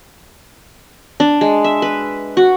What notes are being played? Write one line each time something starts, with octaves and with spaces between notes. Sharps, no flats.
D4
G#3
E5
B4
F#4